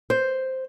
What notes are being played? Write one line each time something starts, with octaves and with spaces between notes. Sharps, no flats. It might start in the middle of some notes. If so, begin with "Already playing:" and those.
C5